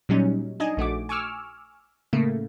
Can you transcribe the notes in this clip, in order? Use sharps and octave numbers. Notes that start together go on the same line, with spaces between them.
A#2 F#3 G3 C#4 D#4
D4 D#4 D#5 G#5
A#1 A3 F#4 D6
G#5 C#6 D6 E6 F6
A2 C#3 A3 A#3